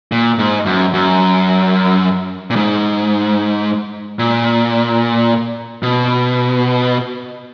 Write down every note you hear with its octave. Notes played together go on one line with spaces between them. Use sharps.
A#2
G#2
F#2
F#2
A#2
G#2
A#2
B2